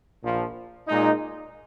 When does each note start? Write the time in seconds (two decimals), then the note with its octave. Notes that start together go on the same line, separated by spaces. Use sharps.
0.22 A#1 A#2 F3
0.88 A#2 G#3 D#4